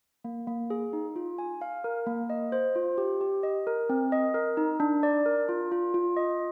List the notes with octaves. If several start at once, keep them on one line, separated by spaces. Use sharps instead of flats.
A#3
A#3
G#4
D#4
F4
G#5
F5
A#4
A#3
D#5
C5
F4
G4
G4
D#5
A#4
C4
D#5
A#4
D#4
D4
D5
A#4
F4
F4
F4
D#5